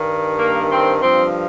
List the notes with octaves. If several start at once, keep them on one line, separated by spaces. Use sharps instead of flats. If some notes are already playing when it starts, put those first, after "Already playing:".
Already playing: G2 D#3
A#3
C4
G2 F3 C4